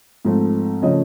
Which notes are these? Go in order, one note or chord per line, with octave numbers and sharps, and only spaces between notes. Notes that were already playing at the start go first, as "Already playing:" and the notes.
G#2 F3 A3 C4
C#3 F3 A3 C#4 D#5